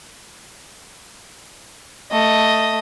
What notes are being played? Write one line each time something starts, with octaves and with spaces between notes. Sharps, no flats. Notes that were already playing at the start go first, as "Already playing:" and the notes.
A3 D#5